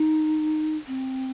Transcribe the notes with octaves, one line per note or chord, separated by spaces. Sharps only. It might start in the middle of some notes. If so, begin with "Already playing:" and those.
Already playing: D#4
C4